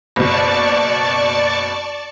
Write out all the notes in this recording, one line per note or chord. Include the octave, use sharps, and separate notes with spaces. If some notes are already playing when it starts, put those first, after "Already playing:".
F#1 B2 D5 A5 C#6